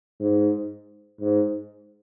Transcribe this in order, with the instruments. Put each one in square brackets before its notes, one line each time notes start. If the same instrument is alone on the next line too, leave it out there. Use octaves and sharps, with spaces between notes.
[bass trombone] G#2
G#2